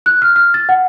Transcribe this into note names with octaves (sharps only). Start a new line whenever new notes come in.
F#6
F6
F6
A6
F#5